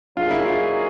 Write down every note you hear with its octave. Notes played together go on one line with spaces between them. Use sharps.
A#2 F#3 A#3 D#4 F4 G#4
E4
F4